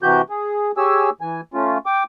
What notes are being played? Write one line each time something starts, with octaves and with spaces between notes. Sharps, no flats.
C3 E3 F#4 G4 G6
G#4
G4 G#4 C#5 G#5 E6
E3 G#5
A3 C#4 F4
G5 D6